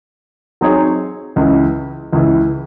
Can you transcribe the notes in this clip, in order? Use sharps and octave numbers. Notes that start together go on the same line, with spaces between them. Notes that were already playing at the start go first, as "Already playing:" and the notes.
F#3 C4 D#4 G#4 C#5
C#2 C#3 E3
C#2 C#3 E3